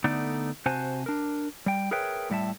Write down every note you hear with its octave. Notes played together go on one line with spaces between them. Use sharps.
D3 A3 B3 D#4 D5
C3 F#4 C5 G#5 A5
D4 A#4
G3 G5
G#4 A#4 B4 C#5 E5 G5
A2 G3 E5 A5